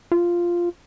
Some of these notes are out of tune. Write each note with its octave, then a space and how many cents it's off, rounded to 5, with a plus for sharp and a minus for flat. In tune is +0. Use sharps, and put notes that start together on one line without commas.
F4 -5